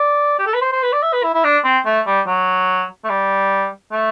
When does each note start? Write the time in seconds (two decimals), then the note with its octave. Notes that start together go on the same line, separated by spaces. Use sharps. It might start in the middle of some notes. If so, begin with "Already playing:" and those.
Already playing: D5
0.39 G4
0.47 A4
0.54 B4
0.62 C5
0.72 C5
0.83 B4
0.93 D5
1.03 E5
1.13 B4
1.23 E4
1.34 E4
1.44 D4
1.64 C4
1.86 A3
2.06 G3
2.27 F#3
3.05 A3
3.10 G3
3.92 A3